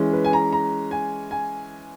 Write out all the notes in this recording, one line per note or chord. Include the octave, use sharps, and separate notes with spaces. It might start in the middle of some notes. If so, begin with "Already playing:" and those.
Already playing: E3 G#3 C#4
B4
G#5
A#5
A#5
G#5
G#5